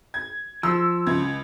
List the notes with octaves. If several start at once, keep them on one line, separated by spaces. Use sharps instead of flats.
G#6
F3 E6
C#2 G#6